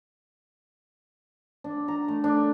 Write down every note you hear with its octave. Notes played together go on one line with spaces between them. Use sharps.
D4
A#5
A3
D4